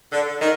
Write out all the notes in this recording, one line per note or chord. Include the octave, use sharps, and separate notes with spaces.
D3
D#3